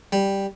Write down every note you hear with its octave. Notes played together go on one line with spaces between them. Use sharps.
G3